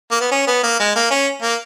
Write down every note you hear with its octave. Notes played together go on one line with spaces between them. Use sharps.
A#3
B3
C#4
B3
A#3
G#3
A#3
C#4
A#3